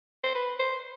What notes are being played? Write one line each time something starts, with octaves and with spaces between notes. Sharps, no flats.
C5
B4
C5